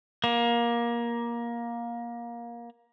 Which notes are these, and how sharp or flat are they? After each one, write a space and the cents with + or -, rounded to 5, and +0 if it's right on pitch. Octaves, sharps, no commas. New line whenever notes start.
A#3 +20